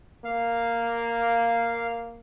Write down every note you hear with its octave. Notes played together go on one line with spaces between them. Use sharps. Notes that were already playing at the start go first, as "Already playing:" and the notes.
A#3 F5